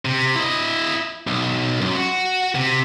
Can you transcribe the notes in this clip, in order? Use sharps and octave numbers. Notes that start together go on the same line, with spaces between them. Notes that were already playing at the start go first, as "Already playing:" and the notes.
C3
E4 D#5
B1
F#2
F#4
C3